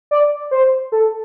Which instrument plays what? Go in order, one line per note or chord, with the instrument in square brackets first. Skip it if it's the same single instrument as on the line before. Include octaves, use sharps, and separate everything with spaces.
[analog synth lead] D5
C5
A4